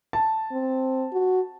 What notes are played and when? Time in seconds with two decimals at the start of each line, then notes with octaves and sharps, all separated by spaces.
0.13 A5
0.52 C4
1.13 F#4